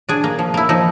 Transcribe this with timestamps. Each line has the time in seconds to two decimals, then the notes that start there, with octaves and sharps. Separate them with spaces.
0.09 D4 G#4
0.24 A#3
0.39 F3
0.54 A#3 E4
0.69 F3 D#4